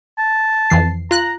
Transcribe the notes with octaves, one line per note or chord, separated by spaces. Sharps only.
A5
F2 E3 C7
F4 A#5 F#6